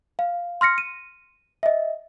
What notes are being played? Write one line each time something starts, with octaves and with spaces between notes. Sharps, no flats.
F5
C6 F6 A#6 C#7
D#7
D#5 E5